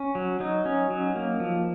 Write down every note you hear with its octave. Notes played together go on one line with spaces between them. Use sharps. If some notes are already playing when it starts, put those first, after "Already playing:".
Already playing: C#4
F#3
F#3 D#4
C#4
F#3
A#3
F3